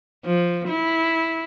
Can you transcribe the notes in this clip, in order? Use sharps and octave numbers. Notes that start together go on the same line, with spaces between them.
F3
E4